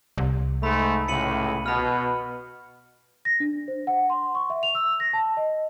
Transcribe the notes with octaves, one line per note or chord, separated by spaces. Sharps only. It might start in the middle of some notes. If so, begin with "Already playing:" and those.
C2
G#2 G#3 A3 B5
C#2 A2 C#3 C#7 D#7 F#7
B2 B5 F6
A#6
D4
C5
F#5
C6
C#6
E5
F7
E6
A#6
A5
D#5